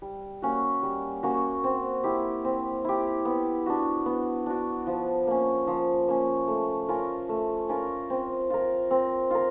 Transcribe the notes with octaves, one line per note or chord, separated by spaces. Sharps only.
G3
A#3 C#4 F#4
G3
A#3 C#4 F#4
C4
E4 G4
C4
E4 G4
B3
D4 F#4
B3
D4 F#4
F3
A#3 C#4
F3
A#3 C#4
A3
C#4 F4 A#4
A3
C#4 F4 A#4
C4
F4 A#4
C4
F4 A#4